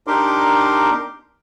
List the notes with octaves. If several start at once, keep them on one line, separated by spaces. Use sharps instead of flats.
D4 D#4 G4 A#4 C6 D6